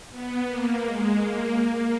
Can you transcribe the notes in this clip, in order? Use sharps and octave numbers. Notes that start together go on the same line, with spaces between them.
B3
A#3
G#3
A#3
A#3